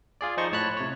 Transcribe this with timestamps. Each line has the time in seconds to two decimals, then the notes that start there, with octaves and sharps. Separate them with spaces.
0.21 F4 G#4 D5
0.37 F3 D#4 C5 D#5 C#6
0.52 A2 C#5 A5 B5 F#6
0.77 C3 C#5